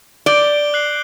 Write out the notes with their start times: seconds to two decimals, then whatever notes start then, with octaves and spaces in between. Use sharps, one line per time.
0.26 D5 D6 G6 D7 G7
0.74 F#6 C7 F#7